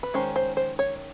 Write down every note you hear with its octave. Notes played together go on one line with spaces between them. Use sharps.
B4
D#3 G#3 C#4 C5
C5
C5
C#5